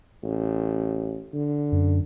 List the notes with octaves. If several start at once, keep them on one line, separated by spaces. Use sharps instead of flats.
A1
D3
F#2